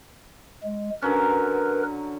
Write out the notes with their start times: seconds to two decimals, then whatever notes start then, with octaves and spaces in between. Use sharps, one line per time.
0.63 G#3
1.02 D3 F#3 C#4 A#4 B4